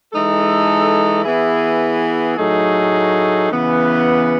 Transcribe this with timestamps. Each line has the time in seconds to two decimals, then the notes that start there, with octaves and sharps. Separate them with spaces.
0.12 E3 G#3 D#4 A4
1.24 E3 B3 E4 G#4
2.37 A2 F#3 A3 D#4 G#4
3.49 C#3 E3 B3